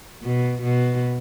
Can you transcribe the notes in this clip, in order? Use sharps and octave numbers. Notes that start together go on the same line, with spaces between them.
B2
B2